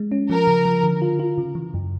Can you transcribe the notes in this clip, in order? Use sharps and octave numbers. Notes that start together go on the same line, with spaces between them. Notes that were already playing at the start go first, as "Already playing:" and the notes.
Already playing: G#3
C#4
F3 A#4
C#3
F3
D3
F4
F4
C#3
E3
F#2